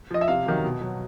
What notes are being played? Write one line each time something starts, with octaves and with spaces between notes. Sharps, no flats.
F3 D#5
E5
C3 F5
D#3 F#3
B2
F#3